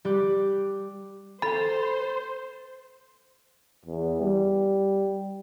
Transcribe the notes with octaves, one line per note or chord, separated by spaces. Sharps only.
G3 G4 D6 F#6
A4 C5 B5
E2
G3